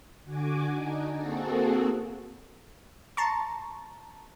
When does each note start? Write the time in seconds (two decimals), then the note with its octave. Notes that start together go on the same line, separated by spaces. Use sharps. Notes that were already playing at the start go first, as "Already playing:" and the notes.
0.24 D3 F#4 G#5 D6
0.73 D4 D#4
1.14 A#3 C4 F#4 G#4 A4
3.17 A5 A#5 C6 C#6